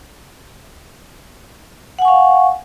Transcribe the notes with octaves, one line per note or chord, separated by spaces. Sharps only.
F5 F#5 G#5 C#6